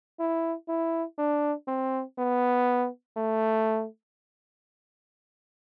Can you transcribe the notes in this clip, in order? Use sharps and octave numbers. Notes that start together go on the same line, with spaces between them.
E4
E4
D4
C4
B3
A3